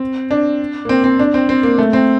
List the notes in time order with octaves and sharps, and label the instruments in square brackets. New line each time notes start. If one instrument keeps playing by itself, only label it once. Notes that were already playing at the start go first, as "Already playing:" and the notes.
Already playing: [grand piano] C4
D4
A#3
C4
C4
D4
C4
C4
A#3
A3
C4